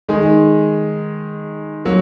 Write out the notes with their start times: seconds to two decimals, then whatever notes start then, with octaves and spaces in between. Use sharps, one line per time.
0.09 D#3 G#3 D#4 G#4
1.85 F#3 A#3